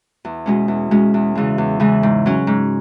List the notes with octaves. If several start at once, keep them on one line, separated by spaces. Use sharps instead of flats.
E2
B2 G#3 C#4
E2
B2 G#3 C#4
E2
C#3 E3 G#3
E2
C#3 E3 G#3
G#2
F#3 C#4
G#2